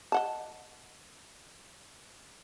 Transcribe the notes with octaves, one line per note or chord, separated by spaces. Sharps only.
D#5 F#5 A5